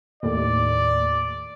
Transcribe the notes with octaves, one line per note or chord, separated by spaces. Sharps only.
D#2 A2 D5